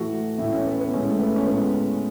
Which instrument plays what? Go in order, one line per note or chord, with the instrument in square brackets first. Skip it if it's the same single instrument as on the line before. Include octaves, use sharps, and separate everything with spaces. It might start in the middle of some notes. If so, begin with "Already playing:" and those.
Already playing: [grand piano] A2 E3 A3 F#4
A2 E3 A3 E4
C#4
B3
B3
A2 G#3 C#4
A3
B3
C#4
A2 G#3 B3